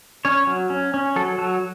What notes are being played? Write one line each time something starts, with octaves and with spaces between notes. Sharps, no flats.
C#4 C#5
F#3
C#4
C#4
F#3 A4
F#3 A4